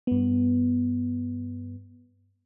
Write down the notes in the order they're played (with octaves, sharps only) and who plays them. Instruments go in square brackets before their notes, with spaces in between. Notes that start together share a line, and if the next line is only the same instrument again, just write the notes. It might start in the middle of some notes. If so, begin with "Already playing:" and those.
[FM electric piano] G2 B3